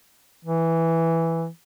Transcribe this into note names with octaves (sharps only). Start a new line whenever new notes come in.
E3